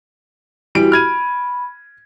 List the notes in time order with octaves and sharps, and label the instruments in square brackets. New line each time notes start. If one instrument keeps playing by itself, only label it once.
[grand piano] E3 G3 D7 [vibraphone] E4 F#4 G4
[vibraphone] B5 [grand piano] F6 G#6 D#7